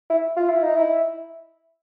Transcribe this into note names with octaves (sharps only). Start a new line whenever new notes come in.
E4
F4
E4
D#4
E4